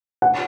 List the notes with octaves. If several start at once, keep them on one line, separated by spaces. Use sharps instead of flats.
F#5